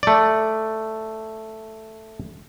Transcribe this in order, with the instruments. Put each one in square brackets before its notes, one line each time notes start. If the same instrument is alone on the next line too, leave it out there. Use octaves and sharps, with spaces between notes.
[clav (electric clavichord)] A3 D5